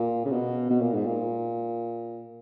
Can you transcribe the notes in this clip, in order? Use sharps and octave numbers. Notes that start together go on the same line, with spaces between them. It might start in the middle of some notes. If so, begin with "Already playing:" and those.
Already playing: A#2
C#3
B2
B2
A#2
G#2
A#2